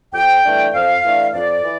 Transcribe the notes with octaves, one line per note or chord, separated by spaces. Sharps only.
F2 G5
E3 A3 D4
F2 F5
E3 A3 D4
F2 D5
E3